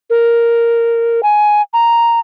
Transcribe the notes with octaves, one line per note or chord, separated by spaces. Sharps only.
A#4
G#5
A#5